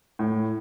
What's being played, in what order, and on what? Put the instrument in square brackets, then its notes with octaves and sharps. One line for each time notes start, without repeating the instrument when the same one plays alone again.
[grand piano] A2